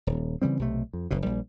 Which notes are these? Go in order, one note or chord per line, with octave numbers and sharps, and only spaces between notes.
D#1
C#3 E3 G3 C4
B1 C3 A3
F2
F#1 B2
A#1 G3